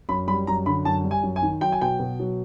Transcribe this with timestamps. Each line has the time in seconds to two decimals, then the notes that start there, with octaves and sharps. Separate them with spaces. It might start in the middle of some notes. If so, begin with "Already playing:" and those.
0.09 F#2 B5
0.28 G3 B5
0.47 F#2 A#5
0.66 D3 B5
0.85 F#2 A5
1.04 G3
1.11 G#5
1.23 F#2
1.36 G#5
1.42 D#3
1.61 F#3 G5
1.72 G#5
1.81 B2 G5
1.99 B2
2.20 F#3